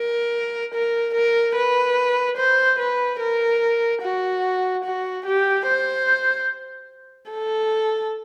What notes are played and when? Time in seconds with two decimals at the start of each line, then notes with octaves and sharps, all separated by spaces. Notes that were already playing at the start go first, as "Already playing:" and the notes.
Already playing: A#4
0.74 A#4
1.14 A#4
1.55 B4
2.37 C5
2.79 B4
3.20 A#4
4.02 F#4
4.84 F#4
5.26 G4
5.67 C5
7.31 A4